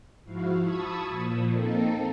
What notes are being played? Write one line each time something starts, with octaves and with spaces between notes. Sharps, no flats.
G#2 F3 E4 F#4 F5
A5 B5 C#6 D#6 E6 G#6
A#2 F3
A#3 C4 D#4 A4